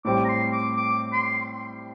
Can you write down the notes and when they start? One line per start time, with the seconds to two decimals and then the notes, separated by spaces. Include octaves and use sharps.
0.05 A2 G3 C4 G4 D6
0.24 A#5
0.29 C6
0.53 D6
0.77 D6
1.13 C6